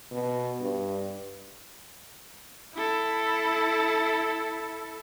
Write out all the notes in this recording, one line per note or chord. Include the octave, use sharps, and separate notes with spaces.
B2
G2
E4 A4